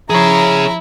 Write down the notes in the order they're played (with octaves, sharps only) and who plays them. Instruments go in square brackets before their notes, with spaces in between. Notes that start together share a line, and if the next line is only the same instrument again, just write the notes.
[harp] F3 G#6 [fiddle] E4 [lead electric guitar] G#4 C#5 [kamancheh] A#5